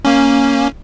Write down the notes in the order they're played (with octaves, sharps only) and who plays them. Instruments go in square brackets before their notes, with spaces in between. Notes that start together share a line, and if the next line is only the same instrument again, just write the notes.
[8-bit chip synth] A#3 C#4